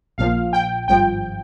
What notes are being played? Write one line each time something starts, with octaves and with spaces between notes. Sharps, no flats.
A#1 A#2 F3 F5
G5
G#1 G2 F3 G5